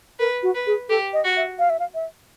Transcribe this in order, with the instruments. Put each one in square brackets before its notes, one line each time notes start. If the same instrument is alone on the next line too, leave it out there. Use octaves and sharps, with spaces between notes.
[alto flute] A#4 [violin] B4
[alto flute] F#4
[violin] B4
[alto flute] G#4
[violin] G4 [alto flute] A4
[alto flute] D#5
[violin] F#4
[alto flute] E5
F5
E5
F5
E5